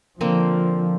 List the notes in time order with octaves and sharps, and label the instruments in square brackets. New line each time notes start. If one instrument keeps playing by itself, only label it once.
[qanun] D3 A#3 C4 [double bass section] F3